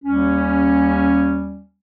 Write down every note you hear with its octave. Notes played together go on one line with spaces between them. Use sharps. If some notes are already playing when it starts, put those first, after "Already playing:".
D#2 G3 C#4